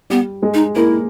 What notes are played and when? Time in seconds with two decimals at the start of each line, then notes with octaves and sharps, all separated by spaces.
0.10 G3 B3 G4
0.42 G#3 G#4
0.54 D#4
0.76 A#3 E4 A#4